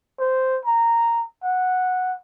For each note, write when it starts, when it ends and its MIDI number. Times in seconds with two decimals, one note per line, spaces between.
0.20 0.59 72
0.65 1.24 82
1.43 2.15 78